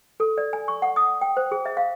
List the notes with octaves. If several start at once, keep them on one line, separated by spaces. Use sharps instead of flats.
A4
D5
G#5
C#6
F#5
D#6
G5
C5
G#4
E5
F5